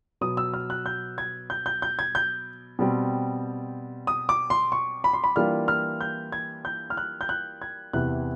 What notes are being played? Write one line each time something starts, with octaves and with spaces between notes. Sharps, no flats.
B2 F#3 B3 D#6
E6
F6
F#6
G6
G#6
G6
G6
G6
G#6
G6
B2 G3 C4
D#6
D6
C6
C#6
B5
C6
B5
E3 G3 A#3 D4 F4 F6
F6
G6
G#6
G6
F6
F#6
G6
F#6
G#6
E2 C3 E3 F#6